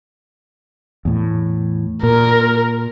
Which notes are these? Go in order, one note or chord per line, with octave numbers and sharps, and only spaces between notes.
E2 A2
A#2 A#4